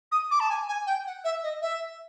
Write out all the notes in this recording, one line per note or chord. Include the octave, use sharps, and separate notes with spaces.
D#6
D6
A5
G#5
G#5
G5
F#5
E5
D#5
E5